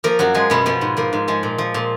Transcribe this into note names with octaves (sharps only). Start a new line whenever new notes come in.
F3 A#3 A#4
F#2 F#3 F#4
F3 G#3 G#4
F#2 B2 B3
B2 F3 B3
G#2
F3 A#3
G#2
F3 G#3
A#2
F3
A#2